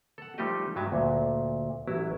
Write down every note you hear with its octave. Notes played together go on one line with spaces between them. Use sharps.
A4 F#5
F3 G3 A3 D#4 G4 D#5
G2 F#3 G#3 E5 A5
D2 A#2
A1 F#3 E4